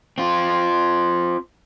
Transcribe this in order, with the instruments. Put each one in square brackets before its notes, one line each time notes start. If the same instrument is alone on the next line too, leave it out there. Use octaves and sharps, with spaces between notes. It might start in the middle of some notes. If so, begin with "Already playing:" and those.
[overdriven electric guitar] C4 F4